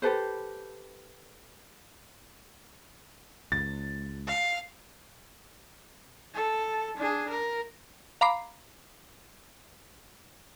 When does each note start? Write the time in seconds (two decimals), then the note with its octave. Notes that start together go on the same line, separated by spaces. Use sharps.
0.02 G4 A4 B4 C5
3.52 C#2 A6
4.28 F5
6.34 A4
6.97 D4 G#4
7.29 A#4
8.21 F5 A#5 B5 D6 C7